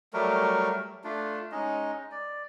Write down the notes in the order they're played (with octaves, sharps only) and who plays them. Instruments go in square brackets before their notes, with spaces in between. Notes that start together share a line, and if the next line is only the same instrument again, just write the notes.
[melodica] F#3 G3 A3 A#4
A3 D4 F4
G#3 C#4 D#4 D#5
D5